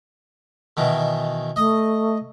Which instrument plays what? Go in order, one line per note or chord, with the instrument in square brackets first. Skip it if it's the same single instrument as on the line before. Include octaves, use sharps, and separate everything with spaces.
[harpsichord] B2 D#3 E3
[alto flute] A3 [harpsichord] D#5 D#6